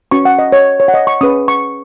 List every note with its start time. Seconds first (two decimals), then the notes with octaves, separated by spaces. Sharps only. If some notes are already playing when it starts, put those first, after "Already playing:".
0.11 C#4 F#4 B4 C#6
0.25 F#5
0.39 D#5
0.52 C#5
0.80 C#5
0.88 F#5
0.94 D#5
1.07 C#6
1.21 C#4 G#4 B4 D#6
1.48 C#6